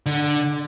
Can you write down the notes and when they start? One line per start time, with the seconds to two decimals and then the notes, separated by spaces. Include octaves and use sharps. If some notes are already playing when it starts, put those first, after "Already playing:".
0.06 D3